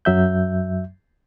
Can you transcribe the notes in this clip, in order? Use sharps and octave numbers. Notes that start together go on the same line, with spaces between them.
F#2 F#3 E5 G6